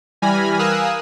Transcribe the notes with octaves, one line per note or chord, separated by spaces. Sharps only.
E3 G3 G#5 B5 F6 A#6
A#4 F5 G#5 D#6 E6 F#6